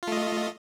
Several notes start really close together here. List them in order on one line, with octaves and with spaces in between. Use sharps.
F4 A3 D#5